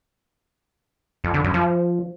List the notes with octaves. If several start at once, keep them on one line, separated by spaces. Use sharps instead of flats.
F2
D3
F#2
F3